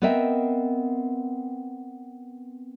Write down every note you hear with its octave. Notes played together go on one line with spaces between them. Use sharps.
B3 C4 A#4 D#5 E5 G5